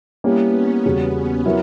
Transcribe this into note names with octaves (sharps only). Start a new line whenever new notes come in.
G3 A#3 B3 C#4 E4 G4
C#4
E2 C#3 G3 B3 C#4 F#4
C#4
F#3 B3 E4 A#4 E5